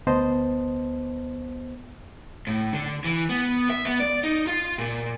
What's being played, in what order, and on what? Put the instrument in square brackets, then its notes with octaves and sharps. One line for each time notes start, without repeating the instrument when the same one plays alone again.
[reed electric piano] D2 B3 C5 D#5 A5
[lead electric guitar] A2
D3
E3
B3
E5
B3
D5
D#4
F4
A#2